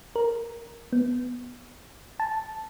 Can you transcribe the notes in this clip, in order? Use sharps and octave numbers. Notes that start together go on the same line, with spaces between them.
A#4
B3
A5